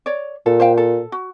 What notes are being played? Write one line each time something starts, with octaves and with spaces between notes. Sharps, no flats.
C#5 D5
A#2 A4
C5 F5 G5
A4
F#4